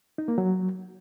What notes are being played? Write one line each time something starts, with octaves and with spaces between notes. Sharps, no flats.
D#4
A#3
F#3